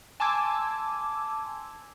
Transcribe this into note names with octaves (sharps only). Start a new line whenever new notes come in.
G#5 A5 C6 D6 E6 G#6